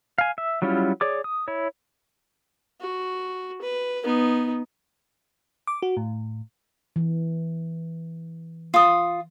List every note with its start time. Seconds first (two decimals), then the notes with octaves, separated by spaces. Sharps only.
0.18 F5 G#5
0.38 E5
0.62 F#3 G3 C#4 E4 F4
1.01 G#4 C#5 D5 D6
1.24 D#6
1.48 E4 C#5
2.80 F#4
3.61 B4
4.04 B3 D#4
5.67 D6
5.82 F#4
5.97 A2
6.96 E3
8.74 F4 D#6